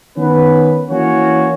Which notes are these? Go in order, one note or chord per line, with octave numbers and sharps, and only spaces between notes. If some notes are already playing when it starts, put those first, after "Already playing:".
D#3 B3 C#4 B4
E3 A#3 C#4 F#4 C#5